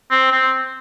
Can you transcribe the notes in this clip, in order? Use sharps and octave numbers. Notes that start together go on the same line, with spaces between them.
C4
C4